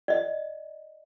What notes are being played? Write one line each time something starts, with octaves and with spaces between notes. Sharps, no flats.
D5 D#5